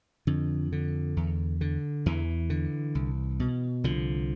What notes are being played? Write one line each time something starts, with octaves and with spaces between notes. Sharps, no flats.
F2 D3
D3
E2
D3
E2 E3
D3
C2
B2
C2 D3 F3